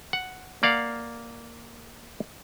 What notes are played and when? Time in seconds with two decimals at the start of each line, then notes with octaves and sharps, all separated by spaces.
0.13 F#5
0.63 A#3 D5 F5 F#5